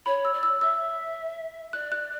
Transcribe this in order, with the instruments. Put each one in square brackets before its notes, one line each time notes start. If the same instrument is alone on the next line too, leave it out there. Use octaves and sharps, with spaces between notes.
[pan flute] C#5 [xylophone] B5
[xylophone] E6
[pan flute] D5
[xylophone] E6
[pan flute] E5 [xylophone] E6
[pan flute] D5 [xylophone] F#6
[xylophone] F#6